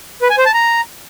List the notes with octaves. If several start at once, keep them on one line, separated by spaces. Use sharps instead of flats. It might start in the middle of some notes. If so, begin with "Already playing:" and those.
B4
G#5
C5
A5
A#5